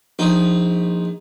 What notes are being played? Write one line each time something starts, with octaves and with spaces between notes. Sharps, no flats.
A#1 D#4